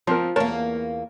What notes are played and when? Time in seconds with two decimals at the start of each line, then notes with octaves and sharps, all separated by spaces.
0.07 F3 C4 F4 A#4
0.36 E2 A#3 A#4 C#5 A5